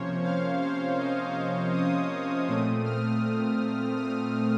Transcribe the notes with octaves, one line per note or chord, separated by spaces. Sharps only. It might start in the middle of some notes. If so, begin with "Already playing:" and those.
Already playing: C3 F3 A#3 C#4 C5 C#5
F5
C5
D#5
F5
D#6
A#2 A3 C4 D#6
F6
D#6
D#6